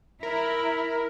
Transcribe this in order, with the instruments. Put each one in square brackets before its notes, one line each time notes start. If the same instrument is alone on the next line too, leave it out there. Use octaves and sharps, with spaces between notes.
[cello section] E4 [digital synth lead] A#4 [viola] A#5 B5